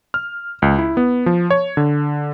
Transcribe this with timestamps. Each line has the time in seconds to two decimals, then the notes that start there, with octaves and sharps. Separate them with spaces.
0.14 F6
0.62 C#2
0.79 E4
0.97 B3
1.26 F3
1.50 C#5
1.77 D3